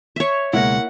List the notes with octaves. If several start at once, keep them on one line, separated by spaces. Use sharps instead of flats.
C#5 E5
C#2 B2 G#3 A#3 E4 F#5